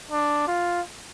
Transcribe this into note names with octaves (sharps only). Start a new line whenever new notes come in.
D4
F4